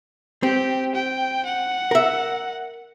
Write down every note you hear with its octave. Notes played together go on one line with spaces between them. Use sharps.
C4 G4
G5
F#5
A#4 E5